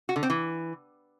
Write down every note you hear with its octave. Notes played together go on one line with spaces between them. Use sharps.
F#4
D3
C4
E3